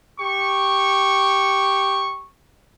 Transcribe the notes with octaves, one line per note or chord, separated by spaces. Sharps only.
G4 C#6